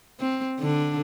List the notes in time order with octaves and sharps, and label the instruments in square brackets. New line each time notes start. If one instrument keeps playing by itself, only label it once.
[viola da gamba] C4
D3 D4